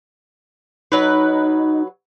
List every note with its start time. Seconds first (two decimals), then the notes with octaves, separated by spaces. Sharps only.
0.92 F#3 D#4 B4